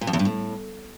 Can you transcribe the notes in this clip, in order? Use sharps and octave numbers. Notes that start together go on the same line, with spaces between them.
A#2
F2
E2
G2
A2